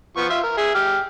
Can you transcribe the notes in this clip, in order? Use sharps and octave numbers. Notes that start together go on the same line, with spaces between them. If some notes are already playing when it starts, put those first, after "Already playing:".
F3 B3 C#6
F4 E5
A#4
G#4 E5
G4 F6